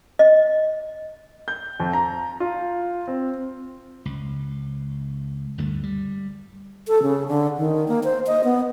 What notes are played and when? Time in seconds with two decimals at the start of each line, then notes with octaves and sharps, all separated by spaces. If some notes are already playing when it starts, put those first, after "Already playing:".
0.19 D#5
1.48 G6
1.80 F2
1.93 A#5
2.40 F4
3.08 C4
4.05 C#2
5.58 D2 G2 D3 A3
5.83 G3
6.88 A4
7.02 C#3
7.28 D3
7.57 D#3
7.88 A#3
8.04 C5
8.27 D#5
8.44 B3